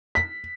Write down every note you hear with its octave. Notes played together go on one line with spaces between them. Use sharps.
B6